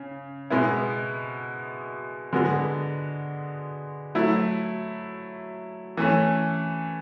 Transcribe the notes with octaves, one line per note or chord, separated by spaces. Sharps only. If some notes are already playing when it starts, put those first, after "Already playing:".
Already playing: C#3
B2 G#3 B3 E4
D3 G#3 B3 F#4
F#3 A3 E4
E3 A3 C#4